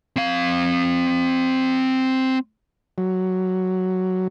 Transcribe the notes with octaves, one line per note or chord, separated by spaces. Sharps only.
C4 F5
F#3